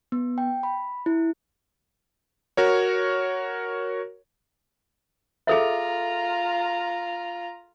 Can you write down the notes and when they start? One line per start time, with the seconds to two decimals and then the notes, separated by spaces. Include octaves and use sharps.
0.12 B3
0.38 G5
0.63 B5
1.06 E4
2.57 F#4 A#4 C#5
5.47 F4 G#4 A4 E5 A#5